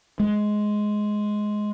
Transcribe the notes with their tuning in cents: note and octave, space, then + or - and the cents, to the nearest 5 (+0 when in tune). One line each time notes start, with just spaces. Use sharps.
G#3 +10